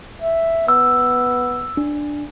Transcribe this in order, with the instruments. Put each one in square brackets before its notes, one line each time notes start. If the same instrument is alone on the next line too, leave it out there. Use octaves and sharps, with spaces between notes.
[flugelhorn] E5
[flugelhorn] B3 [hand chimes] E6
[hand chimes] D4